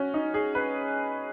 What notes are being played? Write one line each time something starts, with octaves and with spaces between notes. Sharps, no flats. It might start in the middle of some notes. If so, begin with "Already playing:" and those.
Already playing: C#4 F#4
D#4
G#4
B4